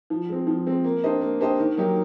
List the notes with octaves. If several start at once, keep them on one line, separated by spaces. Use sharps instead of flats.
F3
G#3 C4
F3
G#3 C4
A#3
D4 G4 C5 D#5
A#3
D4 G4 C5 D#5
D#3
F#3 A#3 D#4 G4